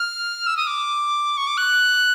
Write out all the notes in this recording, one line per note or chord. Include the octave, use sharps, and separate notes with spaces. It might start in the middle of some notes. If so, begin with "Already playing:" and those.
Already playing: F6
E6
D#6
D6
C#6
D6
F#6